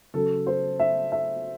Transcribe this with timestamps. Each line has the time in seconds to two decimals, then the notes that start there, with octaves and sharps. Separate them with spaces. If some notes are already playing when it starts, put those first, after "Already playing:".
0.14 C#3 F#3 A4
0.46 C5
0.79 E5
1.12 E5